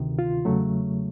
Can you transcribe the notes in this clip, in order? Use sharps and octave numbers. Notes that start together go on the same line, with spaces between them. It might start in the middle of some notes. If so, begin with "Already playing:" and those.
Already playing: D2 C3 D#3
F4
E2 C#3 F#3 A3